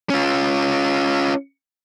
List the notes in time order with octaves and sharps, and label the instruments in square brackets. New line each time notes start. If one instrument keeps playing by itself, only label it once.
[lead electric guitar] C#4 F4